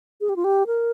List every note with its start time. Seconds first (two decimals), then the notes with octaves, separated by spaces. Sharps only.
0.21 G#4
0.29 G4
0.36 F4
0.44 G4
0.67 A#4